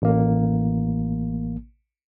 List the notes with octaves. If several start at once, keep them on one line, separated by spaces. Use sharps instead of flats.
A1 A#3